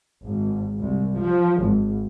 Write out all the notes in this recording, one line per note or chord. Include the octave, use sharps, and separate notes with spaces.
G#1
C2
F3
G#1